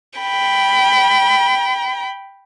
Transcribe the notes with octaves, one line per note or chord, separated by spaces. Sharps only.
G5 B5